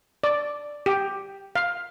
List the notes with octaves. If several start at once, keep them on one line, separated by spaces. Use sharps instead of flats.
D5
G4
F5